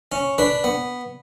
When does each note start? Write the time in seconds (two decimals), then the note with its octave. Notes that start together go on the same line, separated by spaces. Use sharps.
0.12 C#4
0.38 D4 B4
0.64 B3